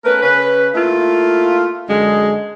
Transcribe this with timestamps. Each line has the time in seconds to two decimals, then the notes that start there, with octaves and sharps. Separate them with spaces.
0.05 A3 C#4 A#4 B4
0.22 C#3 C#4 B4
0.75 A3 A#3 E4 F4
1.89 F#2 D3 G#3